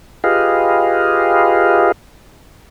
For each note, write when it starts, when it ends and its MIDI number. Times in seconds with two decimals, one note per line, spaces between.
0.24 1.92 65
0.24 1.92 67
0.24 1.92 68
0.24 1.92 71
0.24 1.92 75
0.24 1.92 77